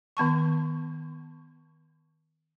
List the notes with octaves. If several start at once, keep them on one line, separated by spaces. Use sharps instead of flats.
D#3 B3 A5 C#6